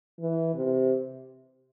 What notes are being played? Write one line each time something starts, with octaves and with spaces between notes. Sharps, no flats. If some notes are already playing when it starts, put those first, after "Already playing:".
E3
C3